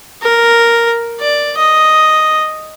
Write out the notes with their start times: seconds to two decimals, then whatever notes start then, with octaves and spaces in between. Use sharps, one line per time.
0.22 A#4
1.20 D5
1.57 D#5